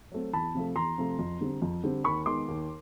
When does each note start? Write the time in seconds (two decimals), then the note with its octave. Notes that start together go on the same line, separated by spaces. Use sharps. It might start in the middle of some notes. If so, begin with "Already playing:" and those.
0.12 F#3 A3 C4
0.33 E2 A5 B5
0.55 C3 F3 A3
0.76 E2 A#5 C6
0.98 C3 F3 A3
1.19 F2
1.41 D3 G3 C4
1.62 F2
1.84 D3 G3 C4
2.04 D#2 B5 C#6
2.26 D#3 G#3 B3 C6 D6
2.48 D#2